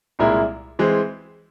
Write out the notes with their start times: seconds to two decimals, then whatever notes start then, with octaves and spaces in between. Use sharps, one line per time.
0.19 C2 A#2 G#3 E4 A#4
0.79 E3 G#3 C4